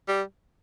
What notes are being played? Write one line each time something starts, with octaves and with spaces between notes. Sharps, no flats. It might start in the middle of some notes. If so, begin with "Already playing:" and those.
G3